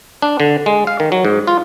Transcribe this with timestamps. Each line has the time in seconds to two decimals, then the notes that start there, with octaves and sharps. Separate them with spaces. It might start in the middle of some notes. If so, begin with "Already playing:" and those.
0.22 D4
0.40 D3
0.66 G#3
0.87 F5
1.00 D#3
1.12 F#3
1.25 G#2
1.47 F4